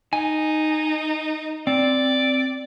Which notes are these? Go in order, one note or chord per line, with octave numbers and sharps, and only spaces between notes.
D#4 G#5
C4 D5